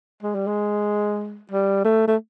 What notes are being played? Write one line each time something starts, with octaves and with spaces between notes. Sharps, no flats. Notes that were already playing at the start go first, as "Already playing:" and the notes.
G#3
G3
G#3
G3
A3
A3